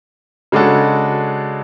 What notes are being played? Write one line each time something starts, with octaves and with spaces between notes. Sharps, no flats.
C#3 G#3 D4 F#4 A4